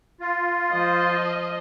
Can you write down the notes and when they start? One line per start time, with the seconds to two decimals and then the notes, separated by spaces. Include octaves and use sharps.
0.21 F4
0.73 F3 D#5